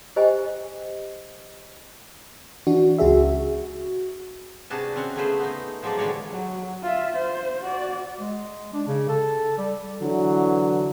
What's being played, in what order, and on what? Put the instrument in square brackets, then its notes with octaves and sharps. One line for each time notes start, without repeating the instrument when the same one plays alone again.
[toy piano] G4 C5 D#5 G5 G#5
[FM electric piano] E3 D4 F#4
C#2 C#3 F#4 G#4 E5
F#4
[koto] C3 D4 F#4 G#4 B4 A5
C4 C#4 F#5
C#3 A3 B3 G#4 B4 C5
B3 D#4
F3 F#3 G#3 D#4 D5
D3 E3 G3 G#3 C#5 D5
[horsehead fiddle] F#3
F4 E5
C5
F#4 D5
[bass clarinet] G#3
D4
C#3
A4
G3
[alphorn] D3 [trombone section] E3 F#3